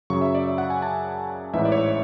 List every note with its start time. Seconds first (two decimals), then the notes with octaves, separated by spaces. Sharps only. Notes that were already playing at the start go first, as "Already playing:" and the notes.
0.10 F#2 C#3 F#3 C#6
0.22 E5
0.35 D5
0.46 E5
0.58 F#5
0.70 G#5
0.82 A5
1.53 A1 G#2 E3 E5
1.65 D5
1.72 C#5